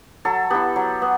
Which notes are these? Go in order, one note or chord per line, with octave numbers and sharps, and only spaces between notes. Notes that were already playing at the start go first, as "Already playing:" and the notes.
F#3 A4
B3 E4 G4
F#3
B3